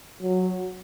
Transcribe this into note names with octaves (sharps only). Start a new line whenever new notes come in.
F#3